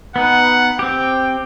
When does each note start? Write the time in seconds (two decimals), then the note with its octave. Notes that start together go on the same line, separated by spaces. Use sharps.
0.16 B3 D#4 B4 F#5
0.79 C4 G4 G5